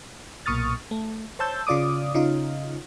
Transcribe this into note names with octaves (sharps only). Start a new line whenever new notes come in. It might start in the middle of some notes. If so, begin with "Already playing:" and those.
B1 A#2 C#6 D#6 F6 A6
A3
C5 C#5 A5 E6 G6
C#3 F4 D5 D6 D#6
C#3 D#4 F4